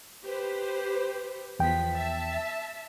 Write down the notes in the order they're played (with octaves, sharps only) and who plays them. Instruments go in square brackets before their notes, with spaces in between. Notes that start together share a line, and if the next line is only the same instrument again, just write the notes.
[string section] G4 B4 C5
[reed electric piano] E2 G5 [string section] F3 B3 B6
[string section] E5 A5